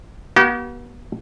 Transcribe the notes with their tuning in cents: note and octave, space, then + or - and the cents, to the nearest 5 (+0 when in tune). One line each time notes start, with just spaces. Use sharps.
B3 -40 G4 -45